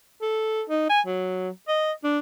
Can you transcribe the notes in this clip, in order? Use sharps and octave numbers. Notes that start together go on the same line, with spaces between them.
A4
D#4
G#5
F#3
D#5
D4